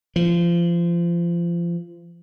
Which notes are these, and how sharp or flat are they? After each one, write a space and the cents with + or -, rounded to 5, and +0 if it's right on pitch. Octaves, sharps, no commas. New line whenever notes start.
F3 -30